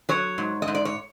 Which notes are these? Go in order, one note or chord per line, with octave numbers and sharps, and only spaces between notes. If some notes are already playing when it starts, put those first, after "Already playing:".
F#3 C#5
G#2
D#5
G#2
D5
C#5